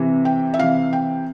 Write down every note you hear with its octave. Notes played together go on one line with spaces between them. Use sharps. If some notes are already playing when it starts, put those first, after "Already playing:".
Already playing: C3 E3
G5
E5
C3 E3 F5
G5